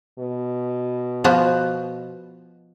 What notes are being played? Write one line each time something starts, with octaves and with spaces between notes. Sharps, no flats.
B2
F3 B3 F#4